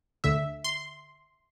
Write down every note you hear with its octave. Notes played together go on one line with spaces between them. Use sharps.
D2 D3 E5
C6